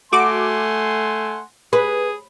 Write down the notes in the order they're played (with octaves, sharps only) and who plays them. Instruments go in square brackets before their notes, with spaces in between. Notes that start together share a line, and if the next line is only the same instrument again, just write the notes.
[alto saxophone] A3 [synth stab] F#4 D6 [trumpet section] F#5 G#5 C6
[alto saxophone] G#4 [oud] B4